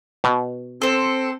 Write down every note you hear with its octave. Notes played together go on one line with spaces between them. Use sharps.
B2
C4 A4 C5